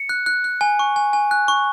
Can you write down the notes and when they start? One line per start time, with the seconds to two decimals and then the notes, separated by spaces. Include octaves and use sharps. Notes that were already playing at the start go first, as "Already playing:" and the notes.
Already playing: C#7
0.09 F#6
0.26 F#6
0.44 F#6
0.61 G#5
0.79 C#6
0.96 G#5
1.13 G#5
1.31 F#6
1.48 C#6